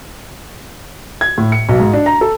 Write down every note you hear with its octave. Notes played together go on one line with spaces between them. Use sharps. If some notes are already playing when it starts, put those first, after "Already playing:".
G#6
A2
C#7
B1
G#2
D4
A#5
A4